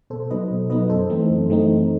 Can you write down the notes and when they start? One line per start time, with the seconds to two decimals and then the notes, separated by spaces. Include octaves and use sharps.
0.10 B2 A4 C5
0.30 F#3 B3 D#4 B4 D#5
0.51 B2
0.70 F#3 B3 D#4 B4 D#5
0.90 F#2 A4 C5
1.10 E3 A3 C4 D#4
1.30 F#2
1.50 E3 A3 C4 D#4